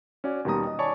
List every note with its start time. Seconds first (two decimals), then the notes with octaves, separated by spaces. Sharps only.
0.24 C#4 F#4 D5 G#5
0.45 D#2 B2 D#3 G3 A#5 D#6
0.67 D#5
0.79 C#5 D5 G#5 A5 B5 C#6